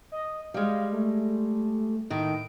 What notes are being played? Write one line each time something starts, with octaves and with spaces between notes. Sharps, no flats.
D#5
G3 G#3 F5
A3
A2 D#3 D7